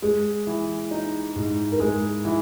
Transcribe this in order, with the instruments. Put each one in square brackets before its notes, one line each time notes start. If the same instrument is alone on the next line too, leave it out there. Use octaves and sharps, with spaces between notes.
[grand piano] G#3 [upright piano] G#4
[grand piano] E3
D#4
G#2
[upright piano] A#4
[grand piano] G#3 [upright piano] G#4
[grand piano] E3